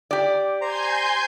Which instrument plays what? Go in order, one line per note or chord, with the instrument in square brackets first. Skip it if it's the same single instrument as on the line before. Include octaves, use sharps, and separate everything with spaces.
[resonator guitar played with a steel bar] G4 D5
[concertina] C5 A#5 [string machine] G#5 C6 G6